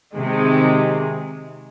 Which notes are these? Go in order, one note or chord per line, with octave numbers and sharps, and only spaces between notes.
C3 D#3 G#3